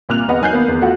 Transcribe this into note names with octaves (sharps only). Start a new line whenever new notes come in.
C2 A#2 F6 F#6 F7
E2 B4 D#5 F#5
D#3 F#3 G#5 F#6 G6 C7
A#3 B3 B4
E2
A3 B3 F4 F#4 F#5